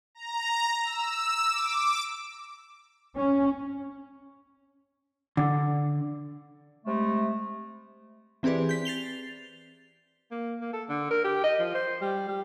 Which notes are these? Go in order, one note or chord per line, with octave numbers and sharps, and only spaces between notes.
A#5
E6
D6
C#4
D3
C3 G#3 A3
E3 C4 G4 G#4 B4 D5
G6 B6
A6 C7 F7 G7
A#3
A#3
A4
D3
A#4
G4
D#5
F3
C5
G3
G3